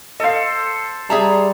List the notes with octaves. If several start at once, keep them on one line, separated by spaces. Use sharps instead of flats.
A4 C5 D#5 F5
G3 G#4 E5 A5 A#5